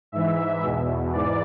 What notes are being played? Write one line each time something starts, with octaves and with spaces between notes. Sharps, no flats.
G#2 E3 E5
E2 B2
G#2 E3 D5